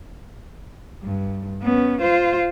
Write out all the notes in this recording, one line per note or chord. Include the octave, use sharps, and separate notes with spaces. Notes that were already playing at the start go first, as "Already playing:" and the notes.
G2
B3 C#4
F4 C5